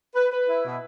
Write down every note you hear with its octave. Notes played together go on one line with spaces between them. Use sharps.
B4
B4
E4
B2